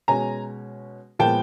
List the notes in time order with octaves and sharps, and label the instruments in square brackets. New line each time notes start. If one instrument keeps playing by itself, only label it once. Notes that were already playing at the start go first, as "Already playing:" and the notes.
[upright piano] B2 G#3 C#4 G#5 A#5
A#2 F3 G#3 B3 G5 A5